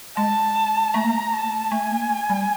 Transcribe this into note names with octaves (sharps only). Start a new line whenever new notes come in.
G#3 A5
A3 A#5
A#3
A3
A5
A3 G#5
A#3
A3
G3